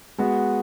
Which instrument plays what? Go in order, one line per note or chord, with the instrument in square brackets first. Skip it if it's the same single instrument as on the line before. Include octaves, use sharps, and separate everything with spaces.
[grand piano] G#3 B3 F#4